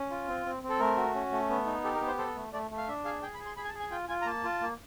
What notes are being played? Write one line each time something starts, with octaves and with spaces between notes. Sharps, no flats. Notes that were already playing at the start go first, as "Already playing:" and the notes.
Already playing: C#4
F4
C4
C4
C4
A4
A3 A#4
F#4
C#4
A3
B3
D#4
G4 A4
A#4
B3
C5
A4 C5
A3
A3 D5
A3
F5
D4 E5
G#4 F5
G#4 G5
B5
G#4
C6
G#4 B5
G#5
A5
G#4
G#5
F4 G5
F4 G#5
A#5
A#3 A5
F4
A#3